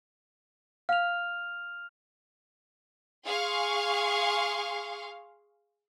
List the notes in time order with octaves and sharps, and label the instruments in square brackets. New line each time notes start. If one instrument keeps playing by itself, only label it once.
[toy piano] F5 [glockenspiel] F6 F7
[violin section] G#4 F5 C6 C#6